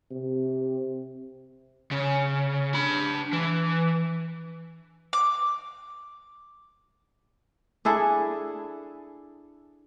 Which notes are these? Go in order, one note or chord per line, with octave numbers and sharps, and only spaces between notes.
C3
C#3
D4 B5
E3
D6
D4 E4 G#4 A4